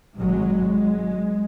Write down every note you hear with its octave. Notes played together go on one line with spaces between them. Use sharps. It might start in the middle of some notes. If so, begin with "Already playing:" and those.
G#1 F#3 G#3
G#3